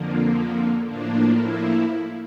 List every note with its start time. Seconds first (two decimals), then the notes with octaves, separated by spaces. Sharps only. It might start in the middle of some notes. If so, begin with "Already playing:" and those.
Already playing: F2 D3 F3 A#3
0.85 A2 F3 A#3 D4
1.38 E4